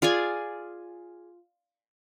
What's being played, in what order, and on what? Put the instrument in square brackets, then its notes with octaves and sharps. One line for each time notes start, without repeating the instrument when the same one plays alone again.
[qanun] F4 G#4 D5 G#5